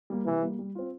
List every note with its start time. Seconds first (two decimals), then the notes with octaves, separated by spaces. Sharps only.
0.10 G3 A#3
0.26 C3 E3
0.42 G3 A#3
0.59 G3
0.75 C4 F4